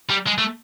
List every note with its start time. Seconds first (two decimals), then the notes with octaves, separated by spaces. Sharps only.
0.10 G3
0.27 G#3
0.38 A3